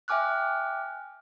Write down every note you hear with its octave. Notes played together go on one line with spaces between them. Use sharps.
E5 G5 G#5 D6 F6 F#6